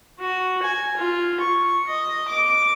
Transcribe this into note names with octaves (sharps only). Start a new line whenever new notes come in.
F#4
G#5
F4
C#6
D#5
D6